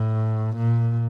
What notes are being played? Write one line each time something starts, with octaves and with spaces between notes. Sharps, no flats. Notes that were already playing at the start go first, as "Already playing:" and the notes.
Already playing: A2
A#2